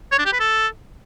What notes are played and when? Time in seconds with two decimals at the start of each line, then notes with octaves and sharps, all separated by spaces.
0.11 C#5
0.18 D4
0.25 G4
0.33 B4
0.40 A4